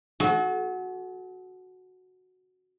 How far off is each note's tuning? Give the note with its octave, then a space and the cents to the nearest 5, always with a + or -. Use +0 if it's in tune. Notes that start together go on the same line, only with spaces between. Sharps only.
F#4 -5 A4 -45